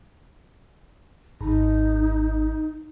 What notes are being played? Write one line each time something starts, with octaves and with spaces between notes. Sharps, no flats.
G#1 D#4